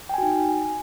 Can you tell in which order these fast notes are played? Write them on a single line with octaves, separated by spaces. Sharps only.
G5 G#5 F#4 D#4